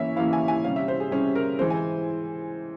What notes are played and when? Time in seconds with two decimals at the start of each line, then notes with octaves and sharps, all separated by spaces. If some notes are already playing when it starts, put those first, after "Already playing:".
Already playing: E3 A#3 C#4 E4 C#5 E5
0.16 E3 A#3 C#4 E4 F5
0.33 G#5
0.48 G#5
0.64 C3 G3 C#4 F5
0.76 E5
0.88 C5
1.00 G#4
1.11 C3 G3 C#4 G#4
1.35 A#4
1.59 E3 G#3 C4 C5
1.70 G#5